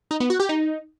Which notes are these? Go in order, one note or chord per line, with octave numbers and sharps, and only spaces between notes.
D#4
B3
F#4
G4
D#4